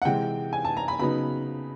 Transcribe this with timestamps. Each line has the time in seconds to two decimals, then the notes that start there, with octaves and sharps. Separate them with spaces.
0.02 F#5
0.05 C3 E3 G#3 C4 G5
0.53 G#5
0.65 A5
0.77 A#5
0.88 B5
0.99 C#3 F#3 B3 D#4 B5